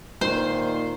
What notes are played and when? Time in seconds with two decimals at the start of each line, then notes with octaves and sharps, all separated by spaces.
0.21 A#2 D#3 C5